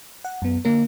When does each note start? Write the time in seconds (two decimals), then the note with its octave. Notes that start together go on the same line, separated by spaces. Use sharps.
0.25 F#5
0.42 F#2 B3
0.65 D3 A#3 A#4